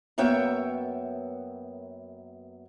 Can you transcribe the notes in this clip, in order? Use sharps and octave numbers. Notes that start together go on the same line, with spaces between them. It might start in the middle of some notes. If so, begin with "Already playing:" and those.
F#2 A#3 B3 C#5 E5 G5